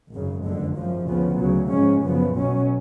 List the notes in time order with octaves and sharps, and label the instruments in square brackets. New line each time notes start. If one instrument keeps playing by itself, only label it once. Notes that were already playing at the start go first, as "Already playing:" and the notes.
[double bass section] G#1 F#2 C#3
F#1 F2 D3 G#3
G#1 F#2 F3
D2 C#3 F3 B3
D2 C#3 F#3
G#2 F3 G#3 C#4
F#2 C#3 F3 B3
B1 B2 F#3 C#4